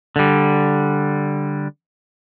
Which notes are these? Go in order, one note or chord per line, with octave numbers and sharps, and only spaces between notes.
D3 G3